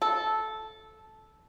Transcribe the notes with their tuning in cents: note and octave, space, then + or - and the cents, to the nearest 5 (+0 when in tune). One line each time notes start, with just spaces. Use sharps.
A4 -10